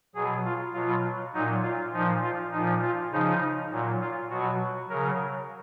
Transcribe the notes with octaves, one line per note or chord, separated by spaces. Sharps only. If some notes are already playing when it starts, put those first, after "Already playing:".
B2 F#3 G#4
F4
B2 F#3 F4
A#2 F#3 D#4
F4
A#2 F3 D#4
F4
A#2 F3 D#4
F4
C#3 F3 D#4
A#2 F#3
F4
B2 F#3 F#4
C#3 F#3 A#4